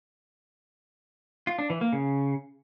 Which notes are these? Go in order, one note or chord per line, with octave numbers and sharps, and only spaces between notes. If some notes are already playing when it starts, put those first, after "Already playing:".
F4
D4
E3
A#3
C#3